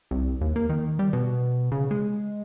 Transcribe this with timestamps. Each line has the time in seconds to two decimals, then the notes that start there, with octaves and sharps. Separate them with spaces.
0.11 C2
0.41 D#2
0.56 A#3
0.69 D#3
0.99 G3
1.13 B2
1.72 C#3
1.91 G#3